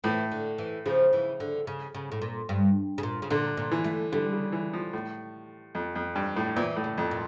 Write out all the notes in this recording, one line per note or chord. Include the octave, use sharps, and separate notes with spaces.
A2 E3
D3
E3
C#3 F3
E3
D3
C#3
C#3
A2
A#2
G2
C#3
A#2
C#3
A#2 D3
A#2
E3
A3
D3 G3
C#3
E3
F3
A2
F2
F2
G2
A2
A#2 E3
A2
C#3
F2
A#2